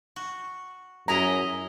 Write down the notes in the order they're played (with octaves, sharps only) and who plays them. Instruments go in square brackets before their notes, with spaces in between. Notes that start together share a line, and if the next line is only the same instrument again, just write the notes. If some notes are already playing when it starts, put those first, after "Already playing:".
[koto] F#4
[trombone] F#2 [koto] E4 G#4 D#5 [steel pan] A#5